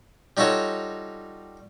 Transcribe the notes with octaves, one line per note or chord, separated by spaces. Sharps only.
G3 D#4 F4 F#4 A4 C#5